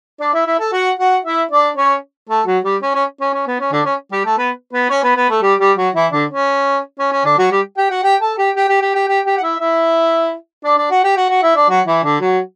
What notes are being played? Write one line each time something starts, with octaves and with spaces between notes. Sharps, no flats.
D4 D5
E4 E5
E4 E5
A4 A5
F#4 F#5
F#4 F#5
E4 E5
D4 D5
C#4 C#5
A3 A4
F#3 F#4
G3 G4
C#4
C#4
C#4
C#4
B3
C#4
D3 D4
C#4
G3 G4
A3 A4
B3 B4
B3 B4
C#4 C#5
B3 B4
B3 B4
A3 A4
G3 G4
G3 G4
F#3 F#4
E3 E4
D3 D4
C#4
C#4
C#4
D3 D4
F#3 F#4
G3 G4
G4 G5
F#4 F#5
G4 G5
A4 A5
G4 G5
G4 G5
G4 G5
G4 G5
G4 G5
G4 G5
G4 G5
F#5
E4 E5
E4 E5
D4 D5
D4 D5
F#4 F#5
G4 G5
F#4 F#5
F#4 F#5
E4 E5
D4 D5
F#3 F#4
E3 E4
D3 D4
F#3 F#4